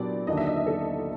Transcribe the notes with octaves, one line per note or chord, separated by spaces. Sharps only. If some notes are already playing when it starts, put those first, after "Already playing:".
Already playing: A#2 F#3 B3 D4 G4 D5
D#2 D3 F#3 A#3 D4 D#5
E5
D#5
D#5
A4